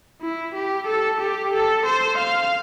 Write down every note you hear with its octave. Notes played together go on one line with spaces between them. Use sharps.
E4
G4
A4
G4
A4
C5
F5